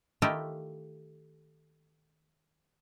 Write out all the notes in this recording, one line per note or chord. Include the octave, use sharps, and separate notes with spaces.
D#3 A3 E4 F4 G4 D#5